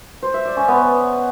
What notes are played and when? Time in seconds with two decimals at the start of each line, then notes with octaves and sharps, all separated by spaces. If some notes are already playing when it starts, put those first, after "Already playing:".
0.22 C5
0.34 E5
0.45 D5
0.57 C#4
0.68 B3